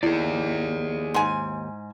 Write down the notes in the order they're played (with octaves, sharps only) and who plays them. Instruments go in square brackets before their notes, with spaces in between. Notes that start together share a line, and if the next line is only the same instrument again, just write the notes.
[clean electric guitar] D#2 [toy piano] E4 [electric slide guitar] G#4 D5
[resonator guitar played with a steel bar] G#2 G#5